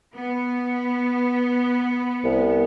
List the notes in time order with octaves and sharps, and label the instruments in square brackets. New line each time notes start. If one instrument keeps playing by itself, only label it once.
[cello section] B3
[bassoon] C2